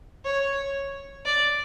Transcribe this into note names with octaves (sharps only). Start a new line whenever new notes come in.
C#5
D5